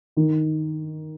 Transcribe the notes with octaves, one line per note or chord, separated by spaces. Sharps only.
D#3